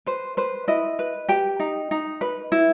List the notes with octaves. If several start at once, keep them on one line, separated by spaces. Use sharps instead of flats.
B4 C5
B4 C5
E4 D#5
B4
G4 G5
D#4
D#4
B4
E4